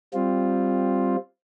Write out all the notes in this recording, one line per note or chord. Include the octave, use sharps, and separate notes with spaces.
G3 C4 F4